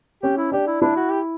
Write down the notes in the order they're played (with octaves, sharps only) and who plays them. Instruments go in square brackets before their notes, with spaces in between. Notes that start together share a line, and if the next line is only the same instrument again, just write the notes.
[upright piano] C#4 [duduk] G4
[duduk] E4
[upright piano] D4 [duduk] G4
[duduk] E4
[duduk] D4 [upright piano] E4
[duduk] F#4
G4